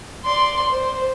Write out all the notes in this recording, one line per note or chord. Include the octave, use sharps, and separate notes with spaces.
D5 C6
C5